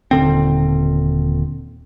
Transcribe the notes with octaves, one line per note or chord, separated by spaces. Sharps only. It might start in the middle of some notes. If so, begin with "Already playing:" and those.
D#1 D3 C4